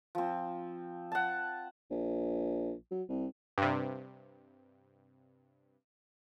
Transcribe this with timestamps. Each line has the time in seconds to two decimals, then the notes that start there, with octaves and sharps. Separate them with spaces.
0.15 F3 C4
1.12 F#5 A5
1.91 A#1
2.91 F#3
3.09 C2
3.58 G2 C3